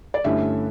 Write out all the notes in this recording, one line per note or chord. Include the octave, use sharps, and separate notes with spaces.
D5
G2 D3 A3 C#4 E4 E5